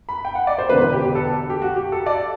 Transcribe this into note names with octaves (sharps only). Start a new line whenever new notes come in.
B5
G5
F#5
D5
C5
E1 E2 D3 B4
B4
G4
G4
A4
G4
F#4
G4
A4
D5